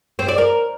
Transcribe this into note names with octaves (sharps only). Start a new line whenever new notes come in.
C4
D5
A#4